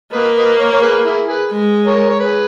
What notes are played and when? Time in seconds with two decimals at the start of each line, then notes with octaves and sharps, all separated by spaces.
0.13 A#3 B4 D#5
0.36 B4 D#5
0.59 A#4 C#5
0.72 C#5
0.81 G#4 B4
1.05 E4 G#4
1.27 G#4 B4
1.52 G#3
1.86 A#4 C#5
2.09 C#5
2.20 G#4 B4